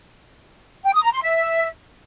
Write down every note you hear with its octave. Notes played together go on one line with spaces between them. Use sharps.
G5
D#6
A#5
C6
E5